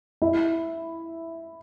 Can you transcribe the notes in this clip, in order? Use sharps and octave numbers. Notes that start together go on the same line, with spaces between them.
E4